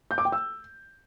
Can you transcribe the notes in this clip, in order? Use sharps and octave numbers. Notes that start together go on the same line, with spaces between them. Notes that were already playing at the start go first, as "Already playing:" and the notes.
G6
D6
G5
E6